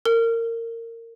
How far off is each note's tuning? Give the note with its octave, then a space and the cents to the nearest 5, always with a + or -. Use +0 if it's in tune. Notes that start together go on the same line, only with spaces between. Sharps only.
A#4 -25